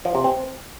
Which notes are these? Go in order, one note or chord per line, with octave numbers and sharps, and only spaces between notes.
F3
C3
C4